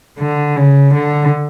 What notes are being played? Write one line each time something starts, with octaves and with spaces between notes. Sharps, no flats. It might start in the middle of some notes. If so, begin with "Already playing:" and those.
D3
C#3
D3